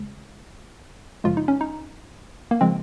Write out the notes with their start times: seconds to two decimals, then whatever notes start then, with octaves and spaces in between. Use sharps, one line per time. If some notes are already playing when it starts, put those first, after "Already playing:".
Already playing: D#2 C#3 G#3
1.24 F#2 C#3 F3 G#3 F4
1.37 D#4
1.48 C#4
1.61 D#4
2.51 A#3
2.61 C#3 F3 G#3 C4